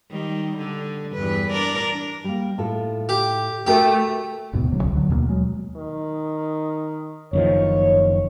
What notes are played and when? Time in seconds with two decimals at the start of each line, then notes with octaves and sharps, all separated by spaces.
0.10 D#3 G3
0.57 D3
1.14 E2 G2 B4
1.51 D4 A#4 D5
2.24 G3 A#3
2.58 A2 F4 A4
3.09 G4
3.66 A3 F#4 G4 A#4
4.53 D2 G#2 B2 B3
4.71 D1 C#3 F#3 G3
4.83 C#2
4.95 D3 F#3
5.09 D#2 B2 G#3 A#3
5.29 F#3 G#3
5.76 D#3
7.33 F#1 D#3 F3 C#5